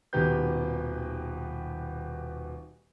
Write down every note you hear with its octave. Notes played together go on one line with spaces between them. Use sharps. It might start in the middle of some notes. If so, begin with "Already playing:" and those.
D#1 B2 D#3 G4 B4 G6